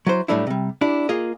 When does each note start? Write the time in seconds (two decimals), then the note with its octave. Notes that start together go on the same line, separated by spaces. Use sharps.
0.07 F#3 E4 C5
0.28 A2 F#3 G3 A3 D4 E4
0.47 C3 G3
0.81 D4 E4 G4
1.09 A#3 F4 G#4 D#5